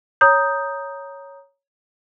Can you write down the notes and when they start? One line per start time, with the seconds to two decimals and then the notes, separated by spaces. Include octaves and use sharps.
0.21 C#5 A#5 D#6 G6